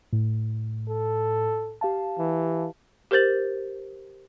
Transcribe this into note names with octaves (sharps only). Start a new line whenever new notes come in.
A2
A4
G4 F5 A5
E3
G4 A#4 C5 G6 A6 F#7